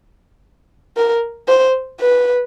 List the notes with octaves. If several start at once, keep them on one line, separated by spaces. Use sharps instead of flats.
A#4
C5
B4